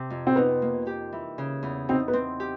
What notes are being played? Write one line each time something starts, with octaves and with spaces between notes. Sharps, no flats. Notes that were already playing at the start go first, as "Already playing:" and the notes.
Already playing: C3
F2
C4
B3 D#4
A#3
G4
E3
C#3
E2
C4 D#4
B3
C4
G4